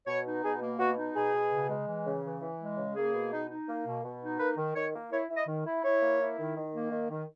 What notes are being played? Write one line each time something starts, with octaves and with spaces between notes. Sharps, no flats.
B2 C#5
D#4
B2 G#4
A#3
B2 F#4
D#4
B2 G#4
B2
C#3
G#3
E3
C#3
E3
E3
G#3
C#3
A#3 G#4
B2
D#4
D#4
A#3
B2
B2
D#4
A#3 B4
D#3
D#3 C#5
A#3
E4 C#5
E4
D#5
D#3
E4
E4 C#5
A#3
E4
D#3
D#3
A#3
D#3
D#3